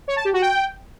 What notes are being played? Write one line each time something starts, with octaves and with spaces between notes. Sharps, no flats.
C#5
A5
G4
F#4
G5